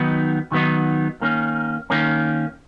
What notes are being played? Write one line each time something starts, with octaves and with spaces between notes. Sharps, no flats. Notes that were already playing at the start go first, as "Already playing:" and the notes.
Already playing: D#3 F#3 B3 D#4
D#3 F#3 B3 D#4
D#3 A#3 C#4
D#3 A#3 C#4